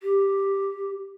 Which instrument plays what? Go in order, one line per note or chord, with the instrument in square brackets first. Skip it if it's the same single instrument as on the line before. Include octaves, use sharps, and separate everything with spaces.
[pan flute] G4